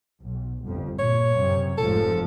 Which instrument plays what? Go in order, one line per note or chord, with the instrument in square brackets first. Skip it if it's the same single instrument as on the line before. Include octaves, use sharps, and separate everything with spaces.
[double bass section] B1
G1 F2
[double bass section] A#2 [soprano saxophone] C#5
[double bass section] F#2 C3
[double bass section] F1 G#2 F3 [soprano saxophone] A4